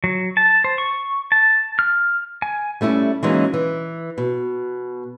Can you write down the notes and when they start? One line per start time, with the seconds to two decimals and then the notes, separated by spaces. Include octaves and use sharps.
0.04 F#3
0.37 A5
0.64 C5
0.78 C#6
1.32 A5
1.79 F6
2.42 G#5
2.81 G3 A3 C#4 E4
3.23 E3 F#3 G#3 A#3 C#4 D#4
3.54 E3
4.18 B2